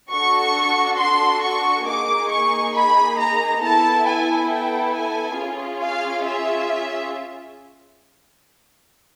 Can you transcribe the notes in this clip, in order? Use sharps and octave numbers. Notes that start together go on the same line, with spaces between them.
D4 F#4 A4 C#6
C6
C#6
A#3 D#4 G#4 D6
C#6
B5
A#5
B3 E4 A4 A5
G#5
G5
G#5
C#4 F4 G#4
F5
E5